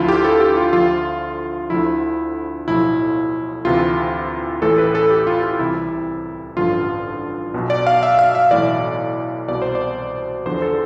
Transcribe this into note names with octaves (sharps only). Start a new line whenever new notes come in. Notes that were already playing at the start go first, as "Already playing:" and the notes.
Already playing: D2 D3 F3 E4 F4
G4
A4
G4
F4
D2 D3 F3 F4
D2 D3 F3 E4
B1 A2 F3 E4
D2 C3 E3 F4
A1 A2 E3 A4
B4
A4
G4
F4
F4
C2 C3 E3 E4
A1 G2 D3 F3 F4
B1 B2
D5
F5
E5
F5
E5
B1 A2 E3 D5
C2 B2 D5
C5
D5
E2 D3 F3 C5
A4